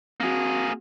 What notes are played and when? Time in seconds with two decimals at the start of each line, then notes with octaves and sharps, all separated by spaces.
0.20 A#3 C4 F#4 G#4